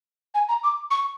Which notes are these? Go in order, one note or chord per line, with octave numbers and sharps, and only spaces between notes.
G#5
A#5
D6
C#6